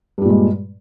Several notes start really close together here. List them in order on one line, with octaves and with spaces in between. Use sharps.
G2 G3 A#2 G#3